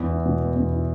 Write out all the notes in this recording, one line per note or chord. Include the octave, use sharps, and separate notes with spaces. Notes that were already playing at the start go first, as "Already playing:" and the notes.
Already playing: E2 B3
E4
B2
B3
E2
E4